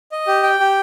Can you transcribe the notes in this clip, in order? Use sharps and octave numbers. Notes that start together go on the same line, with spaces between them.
D#5
G4
G5
G4